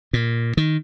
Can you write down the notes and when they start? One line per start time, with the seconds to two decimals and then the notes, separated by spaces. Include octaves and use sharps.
0.13 A#2
0.57 D#3